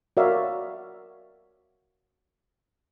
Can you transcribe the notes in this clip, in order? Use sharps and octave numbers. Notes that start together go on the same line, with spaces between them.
F#4 A#4 C#5 D5 E5 F5